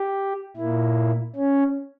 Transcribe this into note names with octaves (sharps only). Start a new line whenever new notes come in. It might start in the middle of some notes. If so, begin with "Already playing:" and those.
Already playing: G4
A#2 A#3 E4
C#4